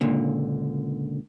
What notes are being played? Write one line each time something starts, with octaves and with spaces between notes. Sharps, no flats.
C#2 A#2 D3